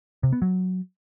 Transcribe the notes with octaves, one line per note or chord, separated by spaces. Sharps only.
C3
B3
F#3